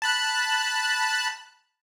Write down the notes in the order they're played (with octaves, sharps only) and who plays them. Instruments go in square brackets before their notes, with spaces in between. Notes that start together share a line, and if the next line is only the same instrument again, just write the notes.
[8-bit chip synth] A5 B5 F#6